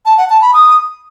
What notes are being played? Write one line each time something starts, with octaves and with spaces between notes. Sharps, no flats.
A5
F#5
A5
B5
D#6